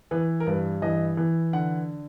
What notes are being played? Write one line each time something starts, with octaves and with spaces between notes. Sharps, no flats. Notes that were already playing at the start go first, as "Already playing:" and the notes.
E3 B4
A#4
G2 B4
E3 D#5
E3
D3 F#5